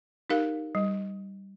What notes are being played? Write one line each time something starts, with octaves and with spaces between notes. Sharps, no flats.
D#4 G4 A#4 F5
G3